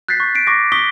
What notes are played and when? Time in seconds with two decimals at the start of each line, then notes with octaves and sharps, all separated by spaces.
0.08 F#6 G6 A6 B6 C7
0.20 C#6
0.35 B6 C7 D7
0.47 C#6 D6 A#6
0.72 C#6 D#6 B6 G7